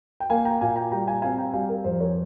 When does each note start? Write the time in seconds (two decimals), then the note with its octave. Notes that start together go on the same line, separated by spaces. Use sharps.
0.20 G5
0.30 A#3 F5 G#5
0.45 G5 A#5
0.61 A#2 F5 G#5
0.76 G5 A#5
0.92 G3 G5 A#5
1.07 F5 G#5
1.22 C4 F5 G#5
1.38 G5 A#5
1.54 G3 F5 G#5
1.69 A#4
1.84 F2 C5
2.00 A#4 C#5